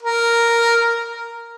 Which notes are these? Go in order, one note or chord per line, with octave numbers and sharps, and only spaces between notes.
A#4